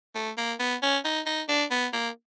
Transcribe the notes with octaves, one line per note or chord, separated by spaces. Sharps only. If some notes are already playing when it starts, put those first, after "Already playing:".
A3
A#3
B3
C#4
D#4
D#4
D4
B3
A#3